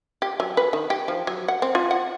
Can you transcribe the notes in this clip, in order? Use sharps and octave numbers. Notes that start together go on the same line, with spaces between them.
G4
F#3
B4
D#3
G4
F3
F#3
F#5
C4
F4
F#5